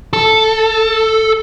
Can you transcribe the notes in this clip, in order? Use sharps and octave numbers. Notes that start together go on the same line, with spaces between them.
A4